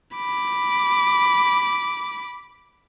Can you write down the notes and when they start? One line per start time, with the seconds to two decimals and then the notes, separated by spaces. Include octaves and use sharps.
0.16 B5 D6